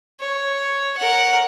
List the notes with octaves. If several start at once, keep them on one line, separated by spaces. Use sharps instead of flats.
C#5
A#4 F#5